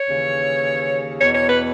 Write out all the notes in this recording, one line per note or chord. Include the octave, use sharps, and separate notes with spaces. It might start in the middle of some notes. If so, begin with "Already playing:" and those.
Already playing: C#5
D#2 C#3 E3
E2 B2 C#5
C#5
B4